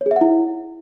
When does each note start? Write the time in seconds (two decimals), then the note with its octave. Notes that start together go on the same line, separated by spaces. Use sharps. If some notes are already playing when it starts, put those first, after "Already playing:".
0.01 C#5
0.06 G#4
0.11 E5
0.16 F#5
0.21 E4